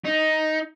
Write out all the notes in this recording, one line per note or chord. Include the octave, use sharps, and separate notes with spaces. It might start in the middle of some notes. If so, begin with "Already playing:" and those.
D#4